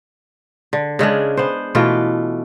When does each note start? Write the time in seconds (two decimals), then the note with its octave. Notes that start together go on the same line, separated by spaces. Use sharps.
0.73 D3
0.99 C#3 G#3 C#4 D4
1.37 B3 C5
1.75 B2 E3 A3 F4